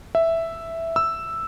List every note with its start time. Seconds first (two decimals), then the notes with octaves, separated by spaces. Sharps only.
0.15 E5
0.96 E6